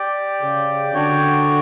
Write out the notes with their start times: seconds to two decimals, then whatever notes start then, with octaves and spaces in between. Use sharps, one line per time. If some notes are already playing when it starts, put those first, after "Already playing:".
Already playing: G4 D5 G5
0.42 C#3
0.93 D3 D4 F#4 C#5 G5